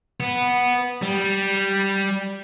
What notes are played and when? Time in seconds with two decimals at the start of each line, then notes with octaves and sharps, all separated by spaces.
0.20 B3
1.02 G3